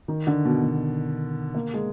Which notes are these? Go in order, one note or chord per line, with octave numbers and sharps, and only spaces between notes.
D#3
D3
B2
B2
A#3
G#3